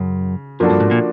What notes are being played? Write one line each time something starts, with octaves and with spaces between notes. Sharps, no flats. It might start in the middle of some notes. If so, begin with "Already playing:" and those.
Already playing: F#2 C#3
F#2 F3 A#3 D4 F#4 A4
G2
G#2
A#2